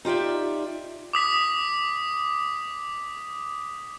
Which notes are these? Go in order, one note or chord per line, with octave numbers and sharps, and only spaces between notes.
D#4 F4 G4 D5 E5
D6 D#6 B6